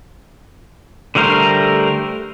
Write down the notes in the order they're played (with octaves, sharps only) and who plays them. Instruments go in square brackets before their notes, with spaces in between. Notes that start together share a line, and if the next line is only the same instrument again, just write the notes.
[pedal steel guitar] D3 G3 A3 A#4 C5